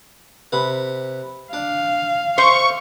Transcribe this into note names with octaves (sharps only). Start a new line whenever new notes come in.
C3 B4
D4 F5
C5 E5 C#6